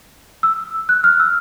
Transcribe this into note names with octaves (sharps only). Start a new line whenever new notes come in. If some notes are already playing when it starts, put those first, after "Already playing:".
E6
F#6
F6
E6